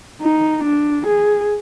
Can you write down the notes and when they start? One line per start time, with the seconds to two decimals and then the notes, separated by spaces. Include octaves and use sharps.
0.22 D#4
0.64 D4
1.07 G#4